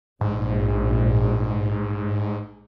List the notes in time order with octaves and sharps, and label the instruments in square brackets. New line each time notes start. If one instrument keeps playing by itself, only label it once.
[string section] A#1 [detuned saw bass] G#2